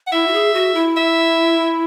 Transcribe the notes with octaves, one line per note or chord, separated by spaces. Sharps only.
F#5
E4 E5
F#4
G#4
F#4
E4
E5